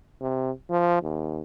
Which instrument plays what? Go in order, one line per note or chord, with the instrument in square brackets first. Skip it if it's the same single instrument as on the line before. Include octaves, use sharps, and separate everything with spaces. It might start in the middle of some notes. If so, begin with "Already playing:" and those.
[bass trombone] C3
F3
D#2